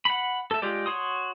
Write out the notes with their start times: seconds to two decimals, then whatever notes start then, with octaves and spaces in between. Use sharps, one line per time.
0.05 F#5 B5
0.51 A4 E5
0.62 G#3 F4 G4 D5
0.86 F#4 C#5 C6 D#6